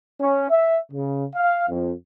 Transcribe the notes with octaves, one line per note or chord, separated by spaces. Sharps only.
C#4
E5
C#3
F5
F2